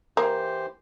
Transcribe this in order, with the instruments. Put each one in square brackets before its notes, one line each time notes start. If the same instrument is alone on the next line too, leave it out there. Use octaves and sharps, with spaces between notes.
[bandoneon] E3 G4 C5 [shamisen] A#3